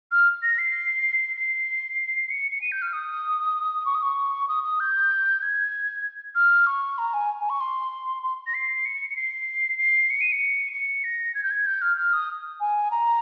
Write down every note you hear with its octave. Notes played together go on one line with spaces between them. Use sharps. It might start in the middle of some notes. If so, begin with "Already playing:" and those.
F6
A#6
C7
C7
C#7
C#7
D#7
G6
F6
D#6
C#6
D#6
C#6
D#6
D#6
G6
G#6
F6
C#6
A#5
G#5
G#5
C#6
C6
C6
A#6
C7
C#7
C#7
C7
C7
C#7
D#7
C#7
C#7
A#6
G#6
G6
G#6
G6
F6
F6
D#6
G#5
A#5